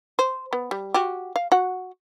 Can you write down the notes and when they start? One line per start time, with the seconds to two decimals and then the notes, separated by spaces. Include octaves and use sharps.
0.19 C5
0.53 B3
0.71 G3
0.94 F#4 G4
1.36 F5
1.52 F#4 F#5